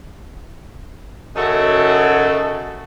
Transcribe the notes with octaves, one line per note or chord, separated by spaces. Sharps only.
F#2 C#3 D#4 F#4 A4 E5